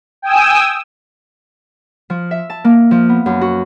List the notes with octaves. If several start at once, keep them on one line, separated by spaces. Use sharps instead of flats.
G5 G#5 D#6 E6
F3
E5
A5
A#3
F3
B3
F#2
F#4